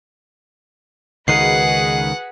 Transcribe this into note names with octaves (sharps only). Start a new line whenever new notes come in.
C#2 D#3 D#4 F#4 G#4 B4 F#5 C7